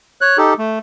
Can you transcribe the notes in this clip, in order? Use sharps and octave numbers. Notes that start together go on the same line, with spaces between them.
C#5 F#6
D#4 G4 A4
A3